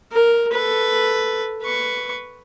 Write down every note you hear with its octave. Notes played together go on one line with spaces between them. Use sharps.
A#4
A4 B4
B4 C#6